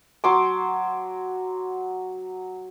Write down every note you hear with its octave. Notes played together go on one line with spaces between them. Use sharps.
F#3 C6 D6